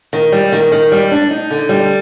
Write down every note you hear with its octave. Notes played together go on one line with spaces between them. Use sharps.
D#3
G3
D#3
D#3
G3
D4
D#4
D3
G3